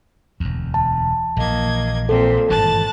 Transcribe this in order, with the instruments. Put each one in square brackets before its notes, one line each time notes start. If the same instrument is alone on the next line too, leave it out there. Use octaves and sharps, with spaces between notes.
[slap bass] E1 D2
[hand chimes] A5
[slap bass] A#1 E3 [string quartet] A#3 D#5 G#6
[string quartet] A#2 C4 [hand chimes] A4
[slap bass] G#1 G2 E3 [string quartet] A5 F#6 A6